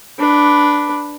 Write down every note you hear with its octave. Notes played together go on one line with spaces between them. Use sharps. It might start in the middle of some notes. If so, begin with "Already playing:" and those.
D4 B4